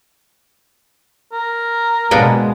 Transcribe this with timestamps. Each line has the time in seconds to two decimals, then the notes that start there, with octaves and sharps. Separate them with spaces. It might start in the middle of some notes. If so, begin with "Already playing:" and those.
1.33 A#4
2.11 B2 G#3 A#3 B3 D4